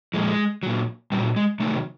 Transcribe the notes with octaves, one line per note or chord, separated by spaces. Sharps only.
A#2 F3 G#3
A#2 F#3
A#2 F#3 G3
G#3
C3 D#3 F#3 A3